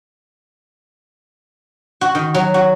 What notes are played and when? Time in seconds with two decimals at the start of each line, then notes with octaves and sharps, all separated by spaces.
2.01 F#4
2.15 D#3
2.34 F#3
2.54 F#4